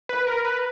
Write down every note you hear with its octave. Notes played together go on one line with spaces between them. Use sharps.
B4
A#4
B4